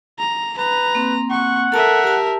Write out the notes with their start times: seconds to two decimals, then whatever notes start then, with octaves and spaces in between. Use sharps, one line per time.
0.19 A#5
0.58 B4 A#5
0.95 A#3 C4
1.31 F#5 C#6
1.72 A4 A#4 E5 A5
2.04 G4 A5